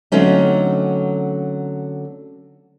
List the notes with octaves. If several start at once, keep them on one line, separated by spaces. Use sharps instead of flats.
D3 F#3 A3 C4 C#4 D#4